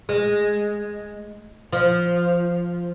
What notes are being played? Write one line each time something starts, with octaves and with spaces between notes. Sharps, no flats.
G#3
F3